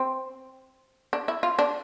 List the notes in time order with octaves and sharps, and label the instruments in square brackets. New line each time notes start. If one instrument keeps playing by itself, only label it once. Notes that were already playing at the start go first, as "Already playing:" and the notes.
Already playing: [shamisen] C4
D4
E4
F4
D4